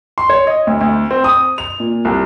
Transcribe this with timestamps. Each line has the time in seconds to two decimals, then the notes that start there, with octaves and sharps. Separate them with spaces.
0.18 C6
0.30 C#5
0.47 D#5
0.67 D2
0.81 D2
1.11 C4
1.24 D#6
1.58 F7
1.80 A#2
2.05 C2